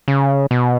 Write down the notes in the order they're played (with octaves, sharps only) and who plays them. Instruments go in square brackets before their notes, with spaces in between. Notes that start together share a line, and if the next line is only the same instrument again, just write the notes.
[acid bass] C#3
B2